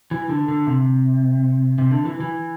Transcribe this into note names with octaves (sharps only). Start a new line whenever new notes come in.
E3
D3
D3
C3
C3
D3
E3
E3